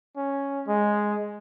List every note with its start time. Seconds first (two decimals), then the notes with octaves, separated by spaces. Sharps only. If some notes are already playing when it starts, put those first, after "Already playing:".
0.17 C#4
0.67 G#3